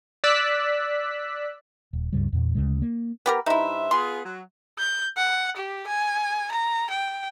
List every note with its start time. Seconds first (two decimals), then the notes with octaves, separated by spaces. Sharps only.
0.24 D5 E6 F#6 B6
1.93 D#1
2.13 C#2 G2 C#3 G3
2.33 E2 A#2
2.55 D2 C#3 G#3
2.82 A#3
3.26 B3 G4 A#4
3.46 G2 D#4 E4 C5 E5
3.91 B3 F4 G#4 C6
4.25 F#3
4.78 G6
5.17 F#5
5.57 G4
5.87 G#5
6.52 A#5
6.90 G5